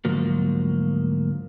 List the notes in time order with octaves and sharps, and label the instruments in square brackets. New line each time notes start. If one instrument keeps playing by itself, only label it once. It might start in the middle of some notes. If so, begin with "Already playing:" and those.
[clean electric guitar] D2 G#2 F3 F#3 A#3